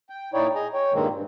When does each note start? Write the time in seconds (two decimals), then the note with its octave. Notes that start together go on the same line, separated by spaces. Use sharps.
0.10 G5
0.34 A#2 D#4 E4 C#5 D5 G5
0.55 G#4 D#5 G#5 A#5
0.74 C#5 G5
0.93 G2 A#2 D#3 G#3 A#3 C4
1.13 G2